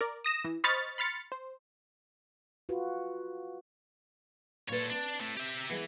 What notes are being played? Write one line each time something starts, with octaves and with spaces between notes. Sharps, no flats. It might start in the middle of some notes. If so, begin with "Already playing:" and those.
A#4 D5
D#6 A#6 E7
E3
C5 D#5 B5 C#6 F6 A6
B5 C6 F6 A6 C#7
C5
F4 F#4 B4
A#2 A4 B4 C#5
C4 D4
A2 A3
G4 E5
E3 G#3 B3